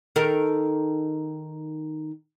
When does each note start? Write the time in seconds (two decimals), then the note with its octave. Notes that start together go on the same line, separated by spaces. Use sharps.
0.16 D#3 A4 A#4